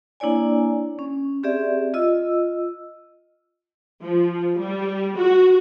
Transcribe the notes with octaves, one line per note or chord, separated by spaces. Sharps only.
A#3 D4 E4 C#5 D5 G#5
C#4
C4 G4 G#4 D5 E5
F4 D#5 E6
F3
G3
F#4